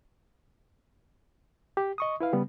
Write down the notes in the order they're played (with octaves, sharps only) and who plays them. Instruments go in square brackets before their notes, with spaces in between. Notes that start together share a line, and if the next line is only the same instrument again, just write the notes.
[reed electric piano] G4
D#5 C#6 D#6
E4 B4 F5
C#3 G3 B3